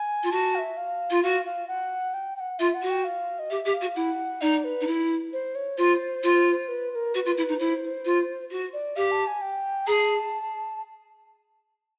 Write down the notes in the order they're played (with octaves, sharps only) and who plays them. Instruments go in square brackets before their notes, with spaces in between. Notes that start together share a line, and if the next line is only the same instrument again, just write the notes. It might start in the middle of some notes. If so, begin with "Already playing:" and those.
Already playing: [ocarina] G#5
[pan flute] F4
[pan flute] F#4 [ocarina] A5
[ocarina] F5
E5
F5
[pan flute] F4
[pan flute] F#4 [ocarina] F5
[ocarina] F5
F#5
G5
G5
F#5
[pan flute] F4 [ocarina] E5
[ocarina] F#5
[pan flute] F#4
[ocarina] G5
F5
D#5
[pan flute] G4 [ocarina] E5
[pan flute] G4
[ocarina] F5
[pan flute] F#4
[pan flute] E4 [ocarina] F#5
[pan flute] D#4 [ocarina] D5
[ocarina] B4
[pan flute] D#4
E4
[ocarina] C5
C#5
[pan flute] F4 [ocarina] C5
[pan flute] F4
[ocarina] B4
B4
A#4
[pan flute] F#4 [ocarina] B4
[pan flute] F4
E4
D#4
[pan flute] E4 [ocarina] C5
[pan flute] F4
F#4
[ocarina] D5
[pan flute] G4 [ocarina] F5
[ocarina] A5
G#5
G5
[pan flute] G#4 [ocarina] A#5
[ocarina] A5